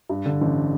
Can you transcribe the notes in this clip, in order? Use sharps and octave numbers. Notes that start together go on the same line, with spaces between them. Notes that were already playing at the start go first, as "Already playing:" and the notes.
G2
D3
A1